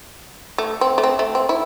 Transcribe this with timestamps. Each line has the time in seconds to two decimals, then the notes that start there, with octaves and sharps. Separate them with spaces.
0.58 A3
0.81 C4
0.98 A3
1.04 C4
1.19 A3
1.35 C4
1.49 E4